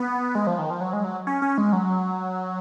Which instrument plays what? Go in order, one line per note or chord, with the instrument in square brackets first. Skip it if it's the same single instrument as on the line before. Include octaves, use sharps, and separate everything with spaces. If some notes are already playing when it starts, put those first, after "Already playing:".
Already playing: [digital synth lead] B3
G#3
F3
D#3
F3
F#3
G#3
F#3
C#4
C#4
G#3
F#3